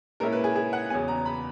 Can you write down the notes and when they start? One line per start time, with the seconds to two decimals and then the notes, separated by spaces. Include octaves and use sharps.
0.20 A#2 G#3 C#4 E4 A#4
0.32 B4
0.44 G#4
0.56 G#4
0.73 F#5
0.90 E2 C#3 F#3 B3 G#5
1.08 A#5
1.26 B5